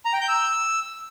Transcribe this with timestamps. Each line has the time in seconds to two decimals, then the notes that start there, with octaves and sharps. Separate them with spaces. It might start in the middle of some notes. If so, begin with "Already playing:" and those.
0.05 A#5
0.13 G5
0.21 G6
0.29 E6